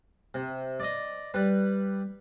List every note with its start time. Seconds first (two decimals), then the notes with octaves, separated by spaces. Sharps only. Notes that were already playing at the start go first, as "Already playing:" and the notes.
0.34 C3
0.80 D5 D#5
1.34 G3 B4